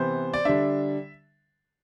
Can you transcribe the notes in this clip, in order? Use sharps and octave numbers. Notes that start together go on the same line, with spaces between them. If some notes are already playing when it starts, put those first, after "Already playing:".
Already playing: C3 E3 B3 C5
D5
D3 G3 D4 E5